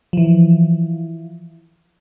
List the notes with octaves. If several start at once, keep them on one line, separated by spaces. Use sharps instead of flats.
E3 F3